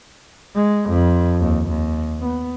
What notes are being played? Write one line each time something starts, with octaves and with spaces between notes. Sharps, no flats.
G#3
F2
D#2
D#2
B3